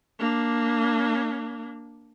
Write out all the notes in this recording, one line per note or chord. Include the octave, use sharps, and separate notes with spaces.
A#3 D4